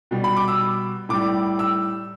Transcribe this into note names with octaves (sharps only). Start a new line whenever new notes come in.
B2 G3
B5
D6
E6
A2 G3 D6
E6